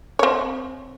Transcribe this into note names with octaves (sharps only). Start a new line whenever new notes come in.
C4 C#5